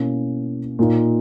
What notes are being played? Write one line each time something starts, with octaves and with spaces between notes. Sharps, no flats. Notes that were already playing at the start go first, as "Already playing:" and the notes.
Already playing: B2 A#3 C#4 E4
A#2 A#3 D#4